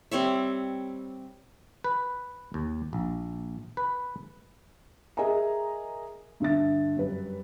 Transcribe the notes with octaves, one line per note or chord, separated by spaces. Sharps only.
G3 C4 C#5 E5
B4
D#2
A#1
B4
G#4 A#4 D#5 E5 G#5 A#5
G2 D3 E5 A6
F#2 G3 B4